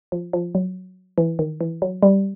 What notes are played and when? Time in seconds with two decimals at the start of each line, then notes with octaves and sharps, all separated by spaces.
0.12 F3
0.33 F3
0.55 F#3
1.18 E3
1.39 D#3
1.61 E3
1.82 F#3
2.03 G3